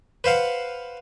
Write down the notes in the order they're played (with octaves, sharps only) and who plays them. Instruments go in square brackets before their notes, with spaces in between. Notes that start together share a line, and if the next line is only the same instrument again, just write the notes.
[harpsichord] B4 C5 F5 F#5